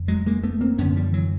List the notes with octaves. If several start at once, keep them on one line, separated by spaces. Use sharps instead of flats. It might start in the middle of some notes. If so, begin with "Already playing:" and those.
Already playing: F2 D3
F#3 G#3
G#3 A#3
A3 B3
A#3 C4
F#2 D3 B3 C#4
F3 G3
E3 F#3